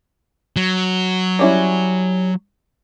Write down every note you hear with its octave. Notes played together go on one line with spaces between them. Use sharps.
F#3
G3 C#4 E4